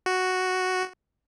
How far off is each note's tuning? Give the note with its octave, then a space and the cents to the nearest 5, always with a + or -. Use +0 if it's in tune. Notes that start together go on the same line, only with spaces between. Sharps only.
F#4 +0